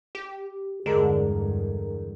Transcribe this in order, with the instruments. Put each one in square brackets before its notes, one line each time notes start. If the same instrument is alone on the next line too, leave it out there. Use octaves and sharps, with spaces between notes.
[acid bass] G4
[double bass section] E2 G2 [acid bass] D3 [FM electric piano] G#3 A#4